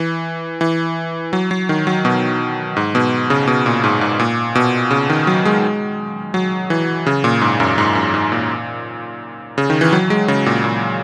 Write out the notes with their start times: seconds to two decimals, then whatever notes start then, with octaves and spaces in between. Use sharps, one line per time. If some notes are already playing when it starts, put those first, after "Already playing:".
Already playing: E3
0.61 E3
1.33 F#3
1.51 F#3
1.69 D#3
1.87 F#3
2.05 B2
2.77 G#2
2.95 B2
3.30 C#3
3.47 B2
3.66 A#2
3.84 G#2
4.01 G#2
4.19 A#2
4.55 B2
4.91 C#3
5.10 D#3
5.27 F#3
5.45 G#3
6.34 F#3
6.70 E3
7.06 C#3
7.24 A#2
7.41 G#2
7.60 F#2
7.78 G#2
7.95 F#2
8.14 G#2
8.32 A#2
9.58 C#3
9.70 D#3
9.81 E3
9.93 F#3
10.10 G#3
10.28 C#3
10.46 A#2
10.64 A#2